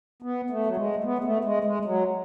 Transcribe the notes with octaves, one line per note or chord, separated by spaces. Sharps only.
B3
A3
F#3
G#3
A3
B3
G#3
A3
G#3
G#3
F#3